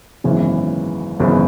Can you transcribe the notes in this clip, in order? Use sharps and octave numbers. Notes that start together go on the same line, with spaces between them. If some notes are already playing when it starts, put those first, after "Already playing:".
G#1 F#2 C#3 E3 B3
G#1 F#2 C#3 E3 B3